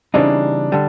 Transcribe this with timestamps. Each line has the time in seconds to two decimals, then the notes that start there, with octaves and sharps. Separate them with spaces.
0.14 C#3 E3 G3 C4 D4 D#4
0.72 D3 G3